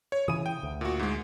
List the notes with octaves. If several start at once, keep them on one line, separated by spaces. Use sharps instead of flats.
C#5
C#3 E3 D#6 D#7
G5
D2
A#2 F#4
G#2 G#3